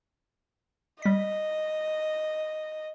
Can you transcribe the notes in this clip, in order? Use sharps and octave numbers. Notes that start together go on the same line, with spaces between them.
G3 D#5 B6